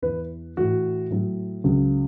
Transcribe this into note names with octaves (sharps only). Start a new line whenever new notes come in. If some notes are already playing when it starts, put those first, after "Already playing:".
E2 E3 B4
A2 E3 F#4
A2 F#3
C#2 C#3 F#3